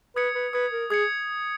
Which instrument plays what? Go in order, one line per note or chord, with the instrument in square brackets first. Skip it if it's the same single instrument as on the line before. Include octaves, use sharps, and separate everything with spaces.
[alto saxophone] B4 [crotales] D#6 G#6 C#7
[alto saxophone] B4
[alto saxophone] B4 [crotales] D#6 G#6 C#7
[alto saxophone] A#4
[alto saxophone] G#4 [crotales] D#6 G#6 C#7